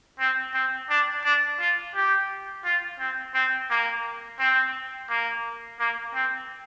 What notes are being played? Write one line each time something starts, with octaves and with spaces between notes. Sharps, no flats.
C4
C4
D4
D4
F4
G4
F4
C4
C4
A#3
C4
A#3
A#3
C4